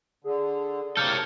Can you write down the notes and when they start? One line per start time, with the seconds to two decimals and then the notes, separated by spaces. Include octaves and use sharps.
0.24 D3 G#4
0.97 C3 A#3 A4 C#5 F6 G6 C#7